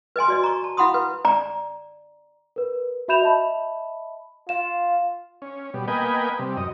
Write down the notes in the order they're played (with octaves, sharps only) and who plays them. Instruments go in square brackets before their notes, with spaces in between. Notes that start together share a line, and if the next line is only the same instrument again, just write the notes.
[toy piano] B4 D#5 G#5 C6
F#4 D5 D#5
A#5 C#6
A5
E4 F5 F#5 B5 C6 D#6
B4
D5 A#5
[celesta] A#4 B4
F#4 E5 B5 G6 E7 F7
D#5 E5 A5 B5
[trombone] F4 [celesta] F5 E7
[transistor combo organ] C#4
B2 G3
A#3 B3 B4 D#5 G5 G#5
C3 G3
F#2 D#5